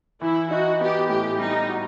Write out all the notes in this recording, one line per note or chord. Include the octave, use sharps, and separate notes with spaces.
E3 E4
D#4 F#4
B3 G4
A2 G4
G3 D#4
F#4